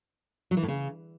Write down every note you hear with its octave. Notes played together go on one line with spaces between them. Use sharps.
F#3
E3
A2
C#3